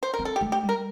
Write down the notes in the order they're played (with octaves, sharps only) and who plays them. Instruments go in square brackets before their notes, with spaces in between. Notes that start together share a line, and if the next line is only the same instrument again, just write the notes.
[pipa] C5
A#4
[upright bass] C4
[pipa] A4
G4
[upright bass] A3
[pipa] G4
[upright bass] G3
[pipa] A#4